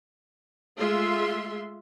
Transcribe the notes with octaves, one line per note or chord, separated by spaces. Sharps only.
G#3 A3 F4 E5 C6